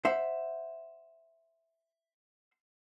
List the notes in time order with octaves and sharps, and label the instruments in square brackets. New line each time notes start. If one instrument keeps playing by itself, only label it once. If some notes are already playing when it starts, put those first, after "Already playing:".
[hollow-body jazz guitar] C5 E5 F#5